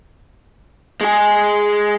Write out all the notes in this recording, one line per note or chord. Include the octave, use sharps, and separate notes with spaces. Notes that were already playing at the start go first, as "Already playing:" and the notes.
G#3 G#4